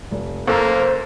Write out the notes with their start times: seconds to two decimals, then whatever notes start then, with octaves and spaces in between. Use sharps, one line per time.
0.11 F1
0.47 F#1 A#3 A4 C5